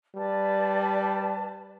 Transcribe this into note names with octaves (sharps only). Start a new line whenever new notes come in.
G3 B4 D5 A5